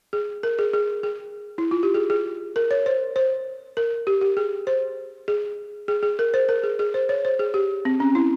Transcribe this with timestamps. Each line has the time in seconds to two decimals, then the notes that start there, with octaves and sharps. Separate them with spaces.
0.13 G#4
0.43 A#4
0.59 G#4
0.73 G#4
1.03 G#4
1.58 E4
1.71 F4
1.83 G4
1.94 G#4
2.10 G#4
2.56 A#4
2.71 C#5
2.86 C5
3.16 C5
3.77 A#4
4.07 G4
4.21 G4
4.37 G#4
4.67 C5
5.28 G#4
5.88 G#4
6.03 G#4
6.19 A#4
6.34 C5
6.49 A#4
6.63 G#4
6.79 G#4
6.94 C5
7.09 C#5
7.25 C5
7.39 G#4
7.54 G4
7.85 C4
8.00 C#4
8.15 E4